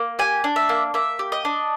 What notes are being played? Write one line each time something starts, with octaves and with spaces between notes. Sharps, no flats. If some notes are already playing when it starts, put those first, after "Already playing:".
Already playing: A#3
G4 G#5
D4
E5
A#3
A#3 E5
G4
D#5
D4